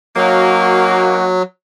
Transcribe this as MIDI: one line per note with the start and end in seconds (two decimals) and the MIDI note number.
0.17 1.43 54
0.17 1.38 58
0.17 1.28 61
0.17 1.28 63
0.17 1.28 66